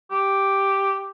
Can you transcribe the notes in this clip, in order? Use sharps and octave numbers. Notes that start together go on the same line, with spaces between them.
G4